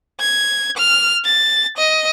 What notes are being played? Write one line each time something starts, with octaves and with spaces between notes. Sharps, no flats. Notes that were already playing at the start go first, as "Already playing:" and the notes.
G#6
F6
A6
D#5